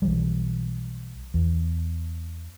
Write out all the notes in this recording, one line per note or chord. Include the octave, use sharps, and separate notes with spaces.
B1 E3 F#3 G3
E2